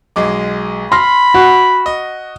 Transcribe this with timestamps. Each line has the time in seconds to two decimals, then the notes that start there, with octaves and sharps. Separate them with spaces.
0.16 B1 G#3 D6
0.92 B5 C6 F6 A#6
1.34 F#4
1.86 D#5